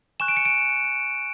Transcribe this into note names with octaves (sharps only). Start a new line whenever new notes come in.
G#5 C#6 F#6 E7
D7
C#7
D7